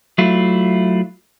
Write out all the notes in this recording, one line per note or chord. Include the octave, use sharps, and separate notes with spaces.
F#3 A3 E4 F4